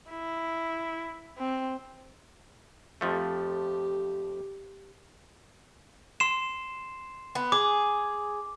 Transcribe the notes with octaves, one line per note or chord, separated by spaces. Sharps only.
E4
C4
F2 F3 A3 G4
C6 C7 E7
B3
G#4 D6